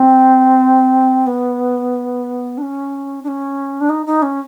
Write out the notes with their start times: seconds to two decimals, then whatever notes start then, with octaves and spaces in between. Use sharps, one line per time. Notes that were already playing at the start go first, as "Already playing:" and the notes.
Already playing: C4
1.26 B3
2.58 D4
2.62 C#4
3.24 D4
3.28 C#4
3.81 D4
3.89 D#4
4.06 D#4
4.22 C#4